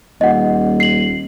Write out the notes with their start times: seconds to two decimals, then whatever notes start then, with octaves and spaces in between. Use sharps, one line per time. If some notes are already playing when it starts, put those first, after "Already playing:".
0.21 D#1 D#5 F#5
0.80 C7 F#7